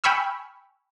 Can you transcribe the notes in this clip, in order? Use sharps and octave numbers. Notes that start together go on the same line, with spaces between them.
G5 G#5 B5 C#6 E6 F6